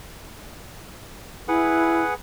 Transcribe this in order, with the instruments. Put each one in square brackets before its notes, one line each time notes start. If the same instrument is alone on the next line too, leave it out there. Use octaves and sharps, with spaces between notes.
[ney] E4 [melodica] G#4 B4 F#5